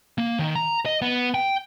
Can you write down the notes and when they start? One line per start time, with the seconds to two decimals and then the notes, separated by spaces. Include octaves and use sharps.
0.18 A#3
0.39 D#3
0.55 A#5
0.86 D#5
1.02 B3
1.34 G5